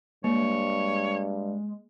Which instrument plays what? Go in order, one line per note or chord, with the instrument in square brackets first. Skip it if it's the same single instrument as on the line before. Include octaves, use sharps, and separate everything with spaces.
[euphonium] G2 [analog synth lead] G#3 [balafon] A#3 [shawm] C#5